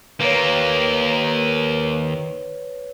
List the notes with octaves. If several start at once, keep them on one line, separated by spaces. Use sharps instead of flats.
D#2 A#3 B4 C#5